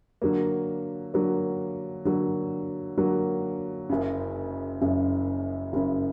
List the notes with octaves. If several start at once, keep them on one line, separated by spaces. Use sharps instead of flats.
D3 F#3 A#3
D3 F#3 A#3
D3 F#3 A#3
D3 F#3 A#3
F#1 F#2 C#3
F#1 F#2 C#3
F#1 F#2 C#3